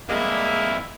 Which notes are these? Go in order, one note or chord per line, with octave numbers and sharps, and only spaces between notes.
F2 G3 G#3 A#3 E4